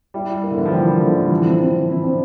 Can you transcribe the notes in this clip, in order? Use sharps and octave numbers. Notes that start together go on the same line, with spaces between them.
G3 E4
E4
A#3
D3
E3 E4
F3
G3 E4
F3 A#3
D3 G3
E3 E4
E3 F3
C4
C4
E3
C4 E4
C4 D4